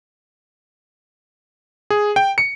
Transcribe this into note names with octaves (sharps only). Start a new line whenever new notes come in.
G#4
G5
C#7